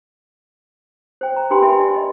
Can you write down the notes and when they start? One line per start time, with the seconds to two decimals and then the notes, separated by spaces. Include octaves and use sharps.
1.21 C5 G5
1.36 A#5
1.50 D4 G4 B4 G5 B5 C6
1.62 G4 A#4 E5 G5 G#5 B5
1.79 D5
1.94 D5 D#5